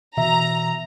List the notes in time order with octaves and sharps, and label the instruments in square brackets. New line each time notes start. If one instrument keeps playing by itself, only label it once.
[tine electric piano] B2 E3 E5 [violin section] A#5